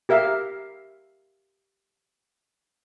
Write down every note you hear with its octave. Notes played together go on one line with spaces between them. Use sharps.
G4 A#4 E5 F5